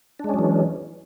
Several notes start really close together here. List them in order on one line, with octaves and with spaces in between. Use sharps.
D4 G#3 C#4 F#3 E3